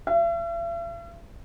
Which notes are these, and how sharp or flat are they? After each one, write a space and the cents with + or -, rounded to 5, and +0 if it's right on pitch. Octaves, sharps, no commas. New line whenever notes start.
E5 +45